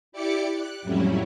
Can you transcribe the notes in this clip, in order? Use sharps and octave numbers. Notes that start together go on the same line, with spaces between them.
E4 G4 D5 D6 C#7
F#6
F2 A2 F#3 G3 C#4 E4